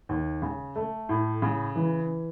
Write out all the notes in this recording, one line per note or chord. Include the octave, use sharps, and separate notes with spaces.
D#2
C#3
A3
A2
C#3
E3